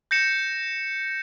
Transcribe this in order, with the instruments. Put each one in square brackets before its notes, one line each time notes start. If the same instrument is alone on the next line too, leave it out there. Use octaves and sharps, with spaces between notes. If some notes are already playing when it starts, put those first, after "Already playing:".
[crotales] G6 A#6 C#7 E7